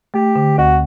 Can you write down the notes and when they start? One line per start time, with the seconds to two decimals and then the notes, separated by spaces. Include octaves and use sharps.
0.14 A3 G4
0.36 D3
0.58 D2 F#4